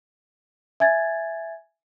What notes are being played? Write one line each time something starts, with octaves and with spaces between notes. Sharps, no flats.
E5 G#5 G#6 A6